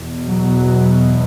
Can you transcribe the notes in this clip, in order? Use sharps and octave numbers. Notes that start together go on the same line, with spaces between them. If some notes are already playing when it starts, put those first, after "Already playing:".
Already playing: E2 B2
F#3